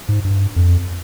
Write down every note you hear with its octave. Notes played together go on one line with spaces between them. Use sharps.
G#2
G2
F2